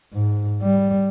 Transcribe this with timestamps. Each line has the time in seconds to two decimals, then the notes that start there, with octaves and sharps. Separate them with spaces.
0.13 G#2
0.63 G3